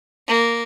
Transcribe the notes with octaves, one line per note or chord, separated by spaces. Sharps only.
A#3